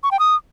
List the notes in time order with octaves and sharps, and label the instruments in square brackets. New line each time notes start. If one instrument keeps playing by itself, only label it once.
[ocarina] C#6
G5
D#6